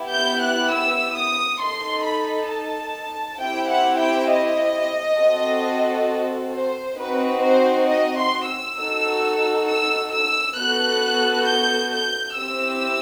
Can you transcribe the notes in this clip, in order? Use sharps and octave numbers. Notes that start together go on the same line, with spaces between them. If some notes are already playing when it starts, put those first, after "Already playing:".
Already playing: B3 E4 G4
G6
F#6
E6
D#6
D#4 A4 C6
B5
A5
C4 E4 G4 G5
F#5
G5
D#5
C4 F#4 A4
C5
C4 D#4 F#4 B4
C5
D#5
C6
E6
D#4 F#4 A4
E6
E6
B3 F#4 A4 F#6
G6
G6
C4 E4 G4 E6